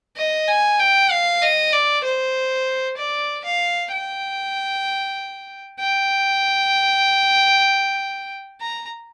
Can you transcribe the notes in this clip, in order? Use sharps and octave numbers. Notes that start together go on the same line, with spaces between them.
D#5
G#5
G5
F5
D#5
D5
C5
D5
F5
G5
G5
A#5